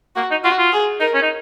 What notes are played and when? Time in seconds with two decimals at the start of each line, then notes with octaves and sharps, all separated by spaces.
0.16 A#3 F#4
0.31 D#4
0.44 F4 F#4
0.59 F4
0.73 G#4
1.00 D#4 A#4
1.14 C#4
1.22 D#4